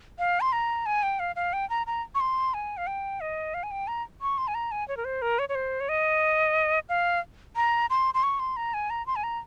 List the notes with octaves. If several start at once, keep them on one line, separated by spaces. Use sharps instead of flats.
F5
C6
A#5
G#5
G5
F5
F5
G5
A#5
A#5
C#6
C6
G#5
F5
G5
D#5
F5
G#5
G5
A#5
C#6
C6
G#5
A#5
G#5
C#5
A#4
C5
A#4
C#5
C#5
C5
C#5
D#5
F5
A#5
C6
C6
C#6
C6
A#5
G#5
A#5
C6
G#5
A#5